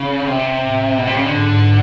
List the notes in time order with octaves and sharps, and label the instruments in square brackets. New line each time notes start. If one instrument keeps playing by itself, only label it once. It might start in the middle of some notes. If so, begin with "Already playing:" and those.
Already playing: [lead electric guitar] C#3
C3
[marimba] A2
[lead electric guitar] B2
C3
C#3
D3
[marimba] G#2